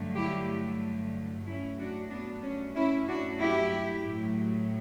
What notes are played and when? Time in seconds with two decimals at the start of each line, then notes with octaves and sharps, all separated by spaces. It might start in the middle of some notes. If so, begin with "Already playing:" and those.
Already playing: G2 D3 F#3 A3
0.16 E4 G4
1.45 G2 F#3 A3 C#4 E4
1.78 D4 F#4
2.10 B3 D4
2.43 C#4
2.76 C#4 E4
3.08 D4 F#4
3.40 E4 G4
4.05 A2 F#3 A3